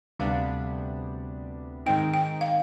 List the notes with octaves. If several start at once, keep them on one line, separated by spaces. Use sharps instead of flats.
D2 C3 G3 B3 D4 F5
G#2 D#3 G#3 C4 D#4 G5
G5
F5